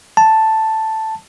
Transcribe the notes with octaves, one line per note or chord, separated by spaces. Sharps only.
A5